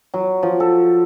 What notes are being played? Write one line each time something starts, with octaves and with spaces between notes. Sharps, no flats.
F#3
F3
A4